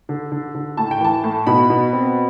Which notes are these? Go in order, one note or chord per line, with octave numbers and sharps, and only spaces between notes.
D3
D3
D3
A2 A5
G5
E3 A5
A2
B2 B5
B2
C4